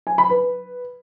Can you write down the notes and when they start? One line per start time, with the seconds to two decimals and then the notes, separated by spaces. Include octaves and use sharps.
0.07 G#5
0.18 B5
0.30 B4